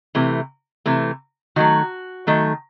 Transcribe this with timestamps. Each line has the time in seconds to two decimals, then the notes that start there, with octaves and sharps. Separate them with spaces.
0.15 C3 E3 A3
0.86 C3 E3 A3
1.56 D#3 F#3 A3 F#4
2.27 D#3 F#3 A3